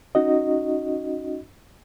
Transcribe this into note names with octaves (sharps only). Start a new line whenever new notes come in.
C#4 D#4 F#4 D#5